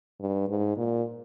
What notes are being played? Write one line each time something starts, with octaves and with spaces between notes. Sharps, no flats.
G2
G#2
A#2